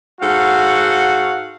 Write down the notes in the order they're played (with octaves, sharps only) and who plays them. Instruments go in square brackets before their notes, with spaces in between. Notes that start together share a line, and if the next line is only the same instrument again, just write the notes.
[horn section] G#2 F#4 A4 F5 F#5